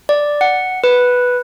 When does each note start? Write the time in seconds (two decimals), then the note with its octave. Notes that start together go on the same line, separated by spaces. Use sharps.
0.09 D5
0.41 F#5
0.84 B4